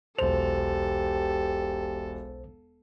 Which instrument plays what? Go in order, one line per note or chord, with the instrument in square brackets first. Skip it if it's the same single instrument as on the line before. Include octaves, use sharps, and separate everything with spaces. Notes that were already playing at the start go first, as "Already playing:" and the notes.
[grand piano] E1 F7 [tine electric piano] B1 C5 [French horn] G4 [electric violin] A4